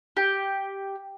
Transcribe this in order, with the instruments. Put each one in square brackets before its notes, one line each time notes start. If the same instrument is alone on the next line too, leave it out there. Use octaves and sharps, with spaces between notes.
[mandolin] G4